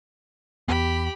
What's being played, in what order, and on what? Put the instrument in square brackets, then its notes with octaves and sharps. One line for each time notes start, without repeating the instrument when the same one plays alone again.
[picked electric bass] E2 B3 [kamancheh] G4 B5